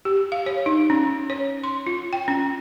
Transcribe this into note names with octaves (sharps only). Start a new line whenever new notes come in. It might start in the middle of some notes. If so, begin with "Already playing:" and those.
G4
F5
C#5
D#4
C#4
C#5
C6
F4
G5
C#4